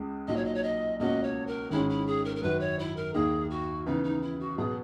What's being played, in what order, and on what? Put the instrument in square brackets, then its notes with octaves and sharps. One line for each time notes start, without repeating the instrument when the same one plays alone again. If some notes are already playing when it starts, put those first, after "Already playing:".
Already playing: [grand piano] C#2 C#3 G#3
[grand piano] B1 A#2 F#3 [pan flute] D#5
[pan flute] C#5
D#5
C#5
D#5
[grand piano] C#2 B2 A#3 C#4 F#4 [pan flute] D#5
[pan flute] C#5
A#4
[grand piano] G#1 G#2 D#3 G#3 C#4 [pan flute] E4
[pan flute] E4
G#4
A#4
A#4
[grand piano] F#2 D#3 F#3 [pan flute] B4
[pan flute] C#5
E4
A#4
[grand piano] D#2 D#3 A#3 D#4 [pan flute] G#4
[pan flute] F#4
[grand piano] C#3 E3 B3 [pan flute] D#4
[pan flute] D#4
E4
F#4
[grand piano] B2 F#3 B3 [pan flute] G#4